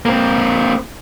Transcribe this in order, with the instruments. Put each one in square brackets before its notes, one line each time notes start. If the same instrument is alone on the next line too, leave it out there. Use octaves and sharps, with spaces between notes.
[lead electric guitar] A#3 C4